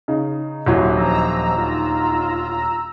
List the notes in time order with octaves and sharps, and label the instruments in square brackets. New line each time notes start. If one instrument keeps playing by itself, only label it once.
[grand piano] C#3 [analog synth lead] D#4
[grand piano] D#1 D2 F#3 [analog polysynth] E4
[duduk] F3 [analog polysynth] A#5 E6
[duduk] F4